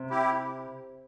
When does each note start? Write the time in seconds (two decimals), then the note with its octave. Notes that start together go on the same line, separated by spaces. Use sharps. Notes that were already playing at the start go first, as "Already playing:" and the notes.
Already playing: C3
0.10 E4 G4